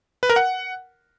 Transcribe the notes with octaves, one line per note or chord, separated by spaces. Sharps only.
B4
A#4
F#5